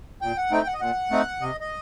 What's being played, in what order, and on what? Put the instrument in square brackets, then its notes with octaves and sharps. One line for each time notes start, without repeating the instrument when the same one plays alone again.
[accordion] A#2 G5
F#5
A3 C4 D#4 G5
F#5
D#5
A#2 F#5
A3 C4 D#4
C3 D#5
D#5